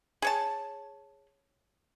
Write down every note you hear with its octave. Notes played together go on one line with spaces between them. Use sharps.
G#4 C#5 A5